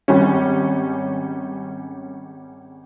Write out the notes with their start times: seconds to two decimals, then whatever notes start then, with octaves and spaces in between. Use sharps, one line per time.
0.08 G#1 G3 C#4